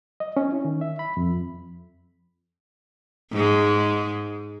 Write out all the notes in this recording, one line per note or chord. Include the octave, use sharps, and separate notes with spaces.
D#5
C#4
E4
D#3
E5
B5
F2
G#2 G#3